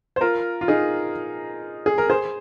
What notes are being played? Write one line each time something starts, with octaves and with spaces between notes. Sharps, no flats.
C5
F4 A#4
F4
D#4 G#4
G#4
A#4
G#4 C5